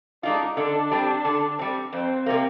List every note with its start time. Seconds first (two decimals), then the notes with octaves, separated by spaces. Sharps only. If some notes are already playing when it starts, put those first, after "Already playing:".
0.23 G#3 D4 D#4 F4
0.57 D3 D4
0.91 G3 C4
1.25 D3
1.59 G3 C4
1.92 F2 C4
2.26 C3 G3 A#3